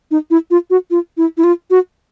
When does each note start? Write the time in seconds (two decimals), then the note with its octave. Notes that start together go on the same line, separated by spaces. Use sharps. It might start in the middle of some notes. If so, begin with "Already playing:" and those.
0.11 D#4
0.31 E4
0.51 F4
0.70 F#4
0.91 F4
1.17 E4
1.38 E4
1.44 F4
1.70 F#4